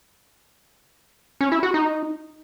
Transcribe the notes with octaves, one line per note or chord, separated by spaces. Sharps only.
C#4
E4
F#4
D#4